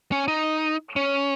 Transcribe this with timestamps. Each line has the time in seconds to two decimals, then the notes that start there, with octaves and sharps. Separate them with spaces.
0.12 C#4
0.28 D#4
0.96 C#4